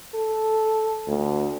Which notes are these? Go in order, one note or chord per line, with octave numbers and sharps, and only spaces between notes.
A4
D2